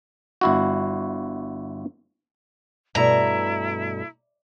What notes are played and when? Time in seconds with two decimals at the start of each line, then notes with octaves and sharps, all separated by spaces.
0.41 G1 E4 F#4
2.95 G2 B2 A3 E4 D5 A#5